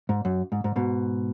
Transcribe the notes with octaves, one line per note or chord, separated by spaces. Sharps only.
G#2
F#2
G#2
G#2
G#2 B2